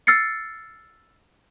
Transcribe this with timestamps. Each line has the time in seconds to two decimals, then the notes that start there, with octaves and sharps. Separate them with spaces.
0.07 E6 F6 A6 C7 C#7